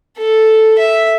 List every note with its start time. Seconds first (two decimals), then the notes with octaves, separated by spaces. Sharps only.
0.18 A4
0.78 E5